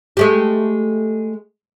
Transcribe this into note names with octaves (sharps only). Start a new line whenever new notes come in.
G#3 A3 G4